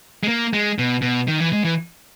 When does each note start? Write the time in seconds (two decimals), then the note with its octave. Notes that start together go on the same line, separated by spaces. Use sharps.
0.23 G#3
0.28 A#3
0.53 G#3
0.78 B2
1.02 B2
1.28 D#3
1.40 E3
1.53 G#3
1.64 E3